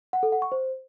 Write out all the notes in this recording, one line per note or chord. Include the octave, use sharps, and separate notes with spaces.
F#5
A4
F#5
C#6
C5